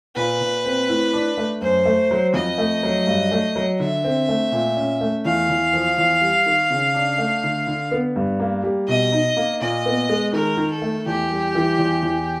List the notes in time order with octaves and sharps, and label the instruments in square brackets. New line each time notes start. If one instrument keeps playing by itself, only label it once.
[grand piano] A#2 [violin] B4
[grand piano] A#2
C4
A2
D4
A3
[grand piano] F#2 [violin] C5
[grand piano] A3
F#3
[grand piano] F2 [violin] D#5
[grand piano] A3
F#3
G2
A3
F#3
[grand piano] D3 [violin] E5
[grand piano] C4
A3
A#2
C#4
A3
[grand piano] E2 [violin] F5
[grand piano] E2
F3
E2
G3
D#3
C#3
D4
A3
D3
D3
B3
G2
A#3
G3
[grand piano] B2 [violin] D#5
[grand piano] D#4
A#3
[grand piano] A#2 [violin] D#5
[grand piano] B3
G#3
[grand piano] D#3 [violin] A#4
[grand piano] D#3
[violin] A4
[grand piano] A3
[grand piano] E2 [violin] G4
[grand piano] G3
E3
E2
E2